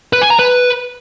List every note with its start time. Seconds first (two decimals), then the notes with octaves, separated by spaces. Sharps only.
0.13 B4
0.22 G#5
0.30 A#5
0.39 B4